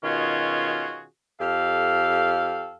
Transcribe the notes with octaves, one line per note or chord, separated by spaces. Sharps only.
B2 D#3 C#4 F4 F#4 G#4
F2 G4 A4 F5